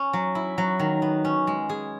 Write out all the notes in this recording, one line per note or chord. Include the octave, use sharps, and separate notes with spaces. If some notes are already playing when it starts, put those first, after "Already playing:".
Already playing: C#4
F#3
E4
F#3
D#3
B3
C#4
G#3
G#4